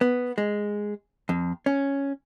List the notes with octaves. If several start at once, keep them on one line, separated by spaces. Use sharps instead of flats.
B3
G#3
F2
C#4